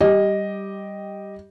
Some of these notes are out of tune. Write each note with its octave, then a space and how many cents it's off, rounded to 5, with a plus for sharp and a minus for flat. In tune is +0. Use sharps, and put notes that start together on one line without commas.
G3 -5 G4 +0 D#5 +0